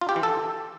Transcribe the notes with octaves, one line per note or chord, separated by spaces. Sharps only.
F4
G4
E3
A4